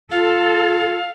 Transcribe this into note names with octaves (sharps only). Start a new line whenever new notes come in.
F4 A4 F5